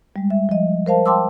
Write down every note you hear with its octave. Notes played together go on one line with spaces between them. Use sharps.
G3 G#3
E5
F3 D#5
A#4 C5 F5 A5
F5 G5 A5 C6 D6 E6